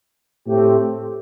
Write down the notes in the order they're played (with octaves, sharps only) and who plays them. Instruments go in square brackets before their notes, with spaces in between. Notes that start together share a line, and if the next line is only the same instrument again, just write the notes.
[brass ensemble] A2 A3 C4 G4